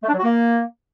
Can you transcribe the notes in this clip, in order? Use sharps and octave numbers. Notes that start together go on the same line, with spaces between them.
A3
D4
F#3
F#4
A#3